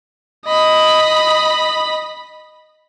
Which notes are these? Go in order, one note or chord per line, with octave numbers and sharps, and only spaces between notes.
D#5 B5